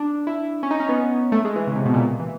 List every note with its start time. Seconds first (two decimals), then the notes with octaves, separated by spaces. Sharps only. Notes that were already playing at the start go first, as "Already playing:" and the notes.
Already playing: D4
0.27 E4
0.63 C#4
0.71 D#4
0.80 C#4
0.89 B3
1.32 A3
1.45 G#3
1.56 E3
1.67 C#3
1.76 C3
1.85 B2
1.94 A#2
2.20 E3